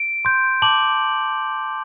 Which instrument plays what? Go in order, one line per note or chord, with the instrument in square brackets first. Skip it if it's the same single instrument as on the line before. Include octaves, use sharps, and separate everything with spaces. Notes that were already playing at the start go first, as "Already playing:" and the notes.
Already playing: [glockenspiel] D7
C6 G6
A5 D6 G6 F#7